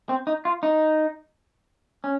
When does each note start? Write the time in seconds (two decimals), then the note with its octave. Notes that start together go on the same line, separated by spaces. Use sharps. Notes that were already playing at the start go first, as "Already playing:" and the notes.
0.09 C4
0.27 D#4
0.45 F4
0.63 D#4
2.04 C#4